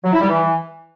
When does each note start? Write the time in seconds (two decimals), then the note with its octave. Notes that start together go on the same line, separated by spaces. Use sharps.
0.04 F#3
0.13 E4
0.21 G3
0.29 E3